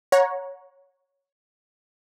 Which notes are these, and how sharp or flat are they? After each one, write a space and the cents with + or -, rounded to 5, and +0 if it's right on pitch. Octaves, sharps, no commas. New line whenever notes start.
C#5 +0 F#5 -20 A#5 +15